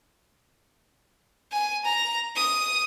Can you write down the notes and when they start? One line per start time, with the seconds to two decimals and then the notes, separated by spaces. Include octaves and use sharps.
1.52 G#5
1.85 A#5
2.36 D#6